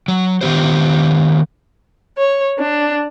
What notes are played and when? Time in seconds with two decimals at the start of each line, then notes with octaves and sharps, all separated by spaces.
0.08 F#3
0.41 D#3 B3 G4 C5
2.17 C#5
2.59 D4